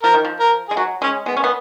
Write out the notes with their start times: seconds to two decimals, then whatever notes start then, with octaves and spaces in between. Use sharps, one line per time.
0.03 F3 A#4
0.14 D#3
0.25 F3
0.40 A#4
0.68 G#3 G#4
0.77 F#3 F#4
1.02 G#3 C#4
1.26 G#3 B3
1.37 C#4
1.44 B3